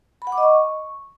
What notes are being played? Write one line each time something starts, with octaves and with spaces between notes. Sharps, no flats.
B5
F#5
D6
D#5
C#6